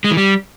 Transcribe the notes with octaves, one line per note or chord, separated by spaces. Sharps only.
G#3
E3
G3